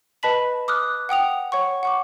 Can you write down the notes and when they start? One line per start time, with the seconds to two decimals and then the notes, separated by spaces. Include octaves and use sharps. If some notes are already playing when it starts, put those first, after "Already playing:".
0.23 B4 D#5 A5 B5 B6 F#7
0.68 D6 D#6 F6 F#6
1.09 F#5 G5 D#6 F7
1.52 C#5 F#5 C#6
1.83 F#5 C#6 D6